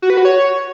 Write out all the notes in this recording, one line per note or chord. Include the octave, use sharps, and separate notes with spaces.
F#4
B4
F#4
C#5